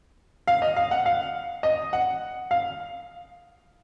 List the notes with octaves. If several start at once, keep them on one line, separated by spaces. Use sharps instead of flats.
F5
D#5
F5
F#5
F5
D#5
F#5
F5